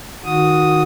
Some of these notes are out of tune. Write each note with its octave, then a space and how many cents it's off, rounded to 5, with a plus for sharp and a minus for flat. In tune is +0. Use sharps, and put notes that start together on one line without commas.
D#3 +0 F#4 -15 D#6 +0